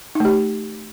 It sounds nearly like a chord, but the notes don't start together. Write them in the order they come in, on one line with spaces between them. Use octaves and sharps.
D#4 A3 G4